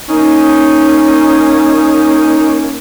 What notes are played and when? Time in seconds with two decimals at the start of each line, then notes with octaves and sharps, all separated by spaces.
0.09 A#3 C#4 D#4